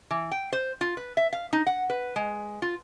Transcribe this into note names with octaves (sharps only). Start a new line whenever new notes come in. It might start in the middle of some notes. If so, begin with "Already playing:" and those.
E3
G5
C5
F4
B4
E5
F5
D#4
F#5
B4
G#3
F4